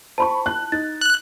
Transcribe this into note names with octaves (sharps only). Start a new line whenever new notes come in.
C5 A5 B5 C#6
F#6
D#4 A6
F#6